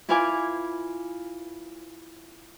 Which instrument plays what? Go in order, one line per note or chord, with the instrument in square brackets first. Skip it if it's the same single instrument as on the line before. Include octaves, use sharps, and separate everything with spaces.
[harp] E4 F4 B4 F5 G#5 D6